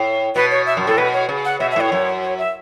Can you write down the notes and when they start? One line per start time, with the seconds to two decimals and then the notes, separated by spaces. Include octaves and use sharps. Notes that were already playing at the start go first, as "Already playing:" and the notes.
Already playing: A2
0.35 B2 B4
0.51 C#5
0.66 E5
0.77 F#2
0.87 A2 A4
0.98 B2 B4
1.13 C#5
1.29 C#3
1.45 F#5
1.60 B2 E5
1.71 E5
1.76 A2 C#5
1.92 F#2
2.23 C#5
2.38 E5